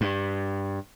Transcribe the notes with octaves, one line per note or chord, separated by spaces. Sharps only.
G2